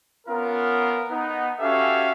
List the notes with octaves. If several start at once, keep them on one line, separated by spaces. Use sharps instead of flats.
B3 C#4 F4 A#4
B3 D#4
C#4 F#4 G4 A4 E5 F5